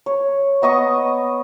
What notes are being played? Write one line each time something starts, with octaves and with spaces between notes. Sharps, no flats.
C#5
B3 D#5 C#6 D#6